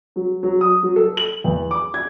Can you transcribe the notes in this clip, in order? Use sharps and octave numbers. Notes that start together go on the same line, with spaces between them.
F#3
F#3
D#6
F#3
A4
F#7
E2
D6
G#6